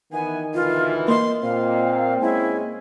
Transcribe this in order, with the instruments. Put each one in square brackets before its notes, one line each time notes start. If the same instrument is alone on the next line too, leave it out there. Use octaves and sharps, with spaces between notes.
[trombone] D#3 [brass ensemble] E3 B3 E4 [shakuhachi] G#5
[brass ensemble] D2 B2 E3 [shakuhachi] F4
[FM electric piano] A#3 D#5 [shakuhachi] C6
[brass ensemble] A#2 [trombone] C4 [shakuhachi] F5
[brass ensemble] G#3 C#4 G#5 [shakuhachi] E4